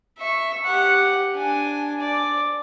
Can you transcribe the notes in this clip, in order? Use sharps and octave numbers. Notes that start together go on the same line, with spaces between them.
E5 C#6
G4 F#5
D4 G#5
D5